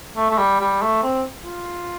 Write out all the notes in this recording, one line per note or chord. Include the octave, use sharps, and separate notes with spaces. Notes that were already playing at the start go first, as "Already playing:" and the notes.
A3
A3
G3
G3
A3
C4
F4